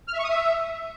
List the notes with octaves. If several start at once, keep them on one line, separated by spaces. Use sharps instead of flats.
F6
E5
C#6
D#6
E5